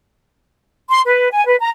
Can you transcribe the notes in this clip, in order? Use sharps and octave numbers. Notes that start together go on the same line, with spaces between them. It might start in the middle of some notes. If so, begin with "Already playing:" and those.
C6
B4
G#5
B4
A#5